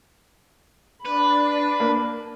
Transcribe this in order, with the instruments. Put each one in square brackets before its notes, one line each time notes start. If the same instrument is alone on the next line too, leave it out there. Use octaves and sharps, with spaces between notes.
[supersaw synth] D4 [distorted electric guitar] B4 [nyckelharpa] B5
[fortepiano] A#3